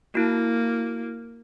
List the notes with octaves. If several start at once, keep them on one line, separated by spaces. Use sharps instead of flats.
A#3 E4 F#4